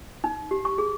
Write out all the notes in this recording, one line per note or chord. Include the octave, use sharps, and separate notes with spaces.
D#4
G4
C#6
G#4